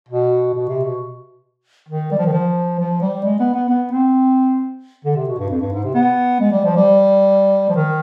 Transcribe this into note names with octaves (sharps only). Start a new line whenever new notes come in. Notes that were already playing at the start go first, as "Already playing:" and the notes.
B2
B2
C3
B2
D#3
G3
F3
D#3
F3
F3
G3
G#3
B3
B3
B3
C4
D3
C3
B2
G2
F2
G2
G#2
C3
B3
G#3
G3
F3
G3
F3
D#3